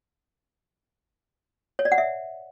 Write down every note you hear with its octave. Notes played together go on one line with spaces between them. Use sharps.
C#5
D5
F#5
E5